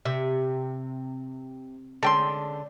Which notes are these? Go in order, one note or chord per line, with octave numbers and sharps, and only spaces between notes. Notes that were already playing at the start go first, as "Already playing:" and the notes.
C3 E5
D3 G#3 C#4 A4 G5 C6